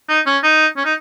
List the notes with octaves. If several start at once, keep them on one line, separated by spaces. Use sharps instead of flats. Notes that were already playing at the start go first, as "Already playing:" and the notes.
D#4
C#4
D#4
C#4
D#4